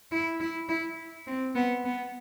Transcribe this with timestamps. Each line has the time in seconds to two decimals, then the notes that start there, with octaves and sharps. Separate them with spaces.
0.12 E4
0.40 E4
0.69 E4
1.27 C4
1.56 B3
1.85 B3